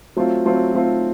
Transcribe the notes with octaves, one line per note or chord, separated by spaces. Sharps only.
F#3 A3 C4 F4
F#3 A3 C4 F4
F#3 A3 C4 F4